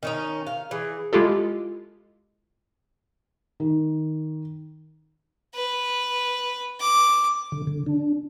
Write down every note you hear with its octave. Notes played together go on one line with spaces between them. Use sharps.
D#3 C#4 D#4
F5
E3 G#4
G#3 E4 F4 G4 A4
D#3
B4
D6
D3
D3
D4